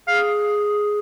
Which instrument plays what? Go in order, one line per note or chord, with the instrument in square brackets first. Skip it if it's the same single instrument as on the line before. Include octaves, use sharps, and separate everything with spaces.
[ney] G#4 [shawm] F5